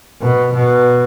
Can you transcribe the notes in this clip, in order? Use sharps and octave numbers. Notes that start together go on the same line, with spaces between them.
B2
B2